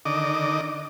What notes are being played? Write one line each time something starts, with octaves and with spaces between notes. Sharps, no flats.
D3 D#3 D#5 D6